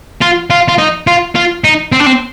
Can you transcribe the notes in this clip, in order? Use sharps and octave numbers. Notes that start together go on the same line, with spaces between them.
F4
F4
F4
D#4
F4
F4
D#4
C4
D4
C4